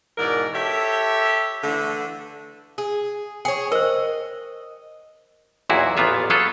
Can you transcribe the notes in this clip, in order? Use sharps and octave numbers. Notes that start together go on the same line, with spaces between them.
G#2 B2 E3 A#4 D5
G4 A4 C#5 E5
D3 E3 A3
G#4
G#4 C#5 G5
A#4 C5 D#5
B1 E2 A#2 E4 F#4 G#4
A1 A#2 B3 F4 E5
F#3 B3 F4 G#4 A4